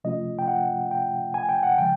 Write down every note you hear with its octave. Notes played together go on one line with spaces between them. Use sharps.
C3 F3 A3 C#4 F4 D#5
G5
F#5
G5
G#5
G5
F#5
C#3 F3 G#3 G5